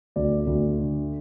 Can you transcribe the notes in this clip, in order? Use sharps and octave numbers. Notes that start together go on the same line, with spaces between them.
D2 D5
D2
D3